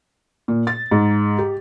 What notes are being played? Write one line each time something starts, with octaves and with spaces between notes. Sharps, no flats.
A#2
A6
G#2
G4